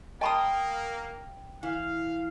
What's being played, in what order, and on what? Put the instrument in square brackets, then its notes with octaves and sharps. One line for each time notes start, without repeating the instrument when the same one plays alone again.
[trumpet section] A#3 [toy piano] D#5 A5 B5 [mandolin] G5 C6 D#6
[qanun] E3 [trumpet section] F5